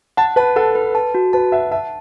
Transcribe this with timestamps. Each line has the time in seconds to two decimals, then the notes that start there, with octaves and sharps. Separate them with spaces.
0.17 F#5 A5
0.36 B4 A5
0.56 A4 F#5
0.75 B4
0.95 A5
1.15 F#4
1.33 B4 A5
1.52 E5 F#5
1.71 E5 A5